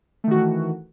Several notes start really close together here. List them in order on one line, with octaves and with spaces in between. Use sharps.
A3 D#3 F#4 E3